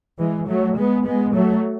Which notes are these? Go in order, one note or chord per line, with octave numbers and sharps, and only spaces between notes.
E3 G#3
F#3 A3
G#3 B3
G#3 B3
F#3 A3